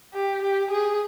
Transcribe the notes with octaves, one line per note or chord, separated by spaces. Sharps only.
G4
G4
G#4